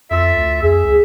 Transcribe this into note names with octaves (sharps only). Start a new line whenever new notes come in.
F2 F4 A4 E5
D2
F2 G#4 E5
C#2